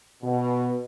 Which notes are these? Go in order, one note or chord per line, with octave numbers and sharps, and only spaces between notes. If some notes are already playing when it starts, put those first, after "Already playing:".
B2